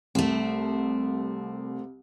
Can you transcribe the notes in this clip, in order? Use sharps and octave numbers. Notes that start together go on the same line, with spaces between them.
C2 A3 C4